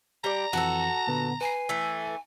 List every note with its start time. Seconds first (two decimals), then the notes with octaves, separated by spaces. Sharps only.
0.24 G3 D5 A#5
0.53 F2 E3 F#4 A4 A5
1.07 A#2 D3 B3
1.41 B4 G#5 C7
1.69 E3 A3